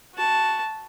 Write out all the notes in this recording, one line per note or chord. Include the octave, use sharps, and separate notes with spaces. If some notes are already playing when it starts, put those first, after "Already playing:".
F#4 A5